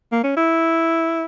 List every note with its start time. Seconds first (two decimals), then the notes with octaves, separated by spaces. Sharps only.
0.12 A#3
0.24 C#4
0.37 E4